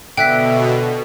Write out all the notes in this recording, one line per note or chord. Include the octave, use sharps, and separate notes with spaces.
B2 D3 E5 G5 F#6 B6